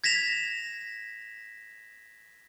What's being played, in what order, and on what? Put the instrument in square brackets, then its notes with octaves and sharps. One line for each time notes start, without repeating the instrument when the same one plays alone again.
[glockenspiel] G#6 A#6 B6 E7 F7